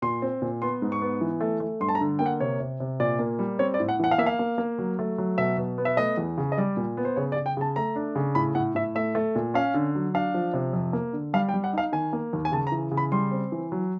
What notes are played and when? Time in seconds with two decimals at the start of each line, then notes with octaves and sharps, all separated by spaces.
0.02 A#2 C6
0.22 C4
0.42 A#2
0.62 B3 C6
0.82 G#2
0.92 C#6
1.02 B3
1.21 E3
1.41 A3
1.60 A3
1.80 G2 C6
1.88 A5
1.95 A#5
2.01 D3
2.19 A#3 G5
2.26 F#5
2.40 C3 C#5
2.60 C3
2.80 C3
3.00 A#2 D5
3.19 A#3
3.39 G3
3.59 C4 C#5
3.74 D5
3.80 A2
3.89 F#5
3.99 E3 F#5
4.11 F5
4.18 A#3 E5
4.26 F5
4.39 A#3
4.58 A#3
4.78 F#3
4.99 A3
5.18 F#3
5.38 B2 E5
5.57 B2
5.78 B3
5.85 E5
5.97 A3 D#5
6.17 E2
6.38 C#3
6.52 D#5
6.58 G3 D5
6.77 A#2
6.97 B3
7.05 C5
7.16 C#3 C#5
7.32 D5
7.36 C#3
7.46 G5
7.57 C#3 A5
7.76 A3 A#5
7.96 D4
8.16 C#3
8.35 A2 B5
8.55 A2 F#5
8.75 A2 E5
8.95 A3 E5
9.15 A3
9.35 A#2
9.54 C#4 F5
9.74 D3
9.95 F#3
10.14 D4 F5
10.34 F3
10.53 C3
10.73 F2
10.93 A#3
11.13 D3
11.34 G3 F5
11.49 G5
11.54 G3
11.64 F#5
11.73 D#4 F5
11.92 D#3 G#5
12.13 A#3
12.33 D#2
12.45 G#5
12.52 C#3 A5
12.67 A#5
12.72 E3
12.92 C#3
12.97 B5
13.12 G3 C6
13.32 C4
13.52 E3
13.72 F#3